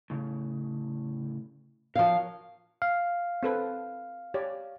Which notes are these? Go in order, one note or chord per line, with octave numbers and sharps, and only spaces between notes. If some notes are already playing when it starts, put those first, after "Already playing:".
A2 C#3
F3 A#4 C#5 F5
F5
C4 A4 B4
G4 C#5 D5